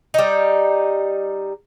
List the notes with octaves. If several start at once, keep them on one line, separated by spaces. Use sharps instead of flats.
G3 D#4